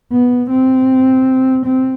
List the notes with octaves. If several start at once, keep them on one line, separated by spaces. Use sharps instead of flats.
B3
C4
C4